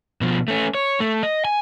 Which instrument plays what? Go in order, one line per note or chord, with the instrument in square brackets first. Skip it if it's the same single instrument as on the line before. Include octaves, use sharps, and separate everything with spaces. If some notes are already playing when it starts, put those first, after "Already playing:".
[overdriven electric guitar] B2 F3
A3 C#4
C#5
A3
D#5
G#5